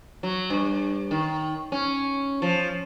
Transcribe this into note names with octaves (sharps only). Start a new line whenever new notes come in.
F#3
G2
D#3
C#4
F3